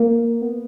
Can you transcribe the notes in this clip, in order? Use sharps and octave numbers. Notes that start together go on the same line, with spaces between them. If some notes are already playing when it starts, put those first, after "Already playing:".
Already playing: A#3
B3